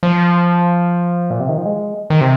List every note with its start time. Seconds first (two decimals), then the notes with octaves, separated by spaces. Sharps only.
0.03 F3
1.30 A#2
1.40 C3
1.49 D#3
1.58 F3
1.66 G#3
2.10 D#3
2.21 C3